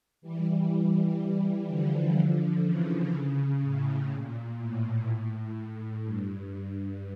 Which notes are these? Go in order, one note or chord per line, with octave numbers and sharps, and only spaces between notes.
E3 G3
D3 F3
C#3 E3
C#3
A2
A#2
A2
G2